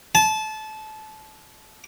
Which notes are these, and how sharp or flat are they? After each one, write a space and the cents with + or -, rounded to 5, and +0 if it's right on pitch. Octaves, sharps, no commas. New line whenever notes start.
A5 -25